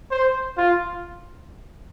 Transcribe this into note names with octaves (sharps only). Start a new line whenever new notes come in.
C5
F4